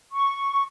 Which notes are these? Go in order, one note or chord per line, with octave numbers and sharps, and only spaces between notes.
C#6